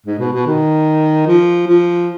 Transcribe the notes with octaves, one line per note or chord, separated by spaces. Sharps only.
G#2
B2
B2
D#3
F3
F3